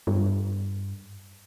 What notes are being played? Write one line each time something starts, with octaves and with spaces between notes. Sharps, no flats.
G2